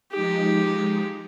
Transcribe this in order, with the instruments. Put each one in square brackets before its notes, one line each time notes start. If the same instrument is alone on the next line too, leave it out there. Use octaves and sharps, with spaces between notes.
[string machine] F3 G#3 D#4 [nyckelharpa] G4